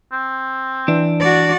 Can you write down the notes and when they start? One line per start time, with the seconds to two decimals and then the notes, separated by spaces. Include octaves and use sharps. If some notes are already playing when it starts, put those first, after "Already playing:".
0.12 C4
0.88 E3 D4
1.20 F#4 D5